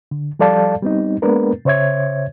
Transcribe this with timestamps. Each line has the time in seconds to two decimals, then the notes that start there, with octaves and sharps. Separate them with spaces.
0.11 D3
0.39 F3 G3 A4 D5 F5 A5
0.82 G3 B3 C4 D#4
1.22 G#3 A#3 B3 D4 A#4 B4
1.65 C#3 C5 C#5 E5 G#6